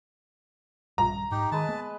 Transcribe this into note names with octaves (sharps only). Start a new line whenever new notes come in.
A#1 G2 A#5
G#2 D#4 G4
D#3 G#3 B4 A5
A#3 B3